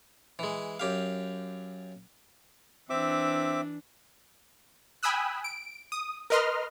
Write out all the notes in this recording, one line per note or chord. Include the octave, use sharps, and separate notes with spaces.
E3 G#3
F#2 G4 F5
E3 C4 D4 E5 D6
G5 G#5 B5 D#6 E6 F#6
D7
D#6
A#4 B4 D#5 C6 F6